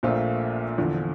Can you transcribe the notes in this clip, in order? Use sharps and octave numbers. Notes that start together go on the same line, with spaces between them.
A#1 A#2 A3 C4 F4
E2 D3 F3